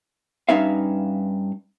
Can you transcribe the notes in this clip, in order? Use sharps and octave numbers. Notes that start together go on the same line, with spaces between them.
G2 C#4 D#4 B4 E5 F5